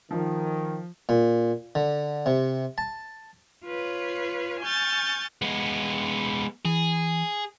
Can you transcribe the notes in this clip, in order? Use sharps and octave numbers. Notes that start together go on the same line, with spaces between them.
D#3 F3
A#2
D3
C3
A5
F4 B4 C#5
G#5 C#6 F6 G6 A6
G#3 B3
E3 G#4